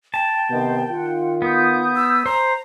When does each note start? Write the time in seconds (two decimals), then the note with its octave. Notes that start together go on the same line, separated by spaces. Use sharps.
0.14 G5 A5
0.50 C3 D#3 B3 C5 D#5
0.91 D#3 F4 F#5
1.42 B3 D#6 G6
1.96 E6
2.26 C5 A#5